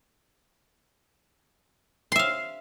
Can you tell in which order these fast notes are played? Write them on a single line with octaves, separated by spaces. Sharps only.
C6 E5 F5